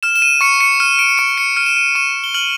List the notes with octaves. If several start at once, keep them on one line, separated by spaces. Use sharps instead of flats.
F6 E7
E7
D#7
C#6 C#7
C#7
F6 D#7
D7
C#6 D7
C#7
F6 D#7
E7
D#7
C#6 E7
G7
F6 F#7